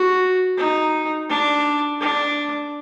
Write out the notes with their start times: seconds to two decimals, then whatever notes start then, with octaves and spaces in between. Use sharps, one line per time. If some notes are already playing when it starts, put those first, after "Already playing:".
Already playing: F#4
0.58 D#4
1.29 D4
2.00 D4